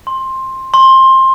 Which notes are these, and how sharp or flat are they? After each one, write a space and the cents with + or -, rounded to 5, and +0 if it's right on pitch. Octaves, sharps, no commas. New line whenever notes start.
C6 +15
C6 +20